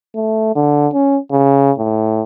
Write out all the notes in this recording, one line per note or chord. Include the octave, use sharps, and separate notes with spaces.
A3
D3
C#4
C#3
A2